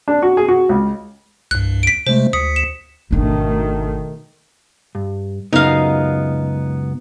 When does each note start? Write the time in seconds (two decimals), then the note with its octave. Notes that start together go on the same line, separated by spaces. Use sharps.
0.08 D4
0.23 F#4
0.37 G#4
0.49 F#4
0.69 C#2
1.51 C2 G2 F#6
1.83 B6 D7
2.07 C3 G#3 A3 C5
2.33 D2 D#6 B6 C#7
2.56 E7
3.11 G#1 B2 D#3 A3 D4
4.95 G2
5.53 C#2 F#2 B3 D#4 F5